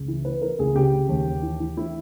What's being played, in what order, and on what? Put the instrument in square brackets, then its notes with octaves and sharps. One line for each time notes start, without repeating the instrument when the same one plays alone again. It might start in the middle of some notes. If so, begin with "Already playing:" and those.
Already playing: [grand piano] C#2
E3
E3 B4
E3 A#4
C#2 G#4
C#3 G4
C#3
D#2
D#2
E3
E3
E3 E4